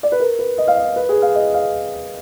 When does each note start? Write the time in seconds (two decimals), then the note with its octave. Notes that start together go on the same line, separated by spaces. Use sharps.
0.03 D5
0.12 B4
0.20 A#4
0.39 B4
0.58 D#5
0.68 F5
0.77 D#5
0.96 B4
1.09 G#4
1.22 F5
1.35 D#5
1.54 F5